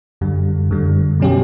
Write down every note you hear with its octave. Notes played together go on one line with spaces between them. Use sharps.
F#2 D3 G3
F#2 D3 G3
B2 F#3 C#4 G4